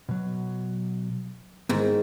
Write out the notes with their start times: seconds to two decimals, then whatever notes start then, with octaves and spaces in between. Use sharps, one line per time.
0.09 B2 F#3
1.69 G#2 D#3 B3 E4 D#5